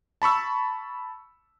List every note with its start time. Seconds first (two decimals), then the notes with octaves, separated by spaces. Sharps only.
0.22 A5 B5 C#6 E6